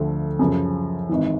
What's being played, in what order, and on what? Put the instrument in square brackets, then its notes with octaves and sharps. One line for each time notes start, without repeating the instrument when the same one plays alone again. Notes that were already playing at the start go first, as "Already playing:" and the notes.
Already playing: [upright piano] D2 D3 F3 A3
F#2 C#3 F3
G#1 G#2 E3